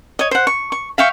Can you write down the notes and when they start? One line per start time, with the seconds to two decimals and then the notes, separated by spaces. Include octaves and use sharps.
0.19 C#5 D#5
0.31 C5 F#5
0.47 C#6
0.72 C#6
0.98 E5 F5 G5 C#6